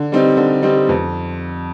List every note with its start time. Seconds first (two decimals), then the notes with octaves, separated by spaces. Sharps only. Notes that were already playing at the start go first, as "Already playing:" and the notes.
Already playing: D3
0.12 G3 C4 D#4
0.37 D3
0.62 G3 C4 D#4
0.89 F2